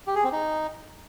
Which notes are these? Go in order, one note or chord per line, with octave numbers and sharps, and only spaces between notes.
G4
G#4
C4
D#4